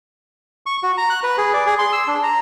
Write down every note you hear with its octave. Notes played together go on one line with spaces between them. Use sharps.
C#6
F#4
A#5
F#6
B4
G#4
D5
G#4
C6
E6
D4
A#5